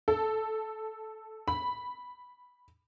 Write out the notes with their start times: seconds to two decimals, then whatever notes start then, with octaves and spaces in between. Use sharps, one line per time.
0.08 A4
1.48 B5